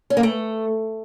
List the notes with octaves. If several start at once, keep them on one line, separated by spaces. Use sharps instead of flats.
C#4
A#3
A3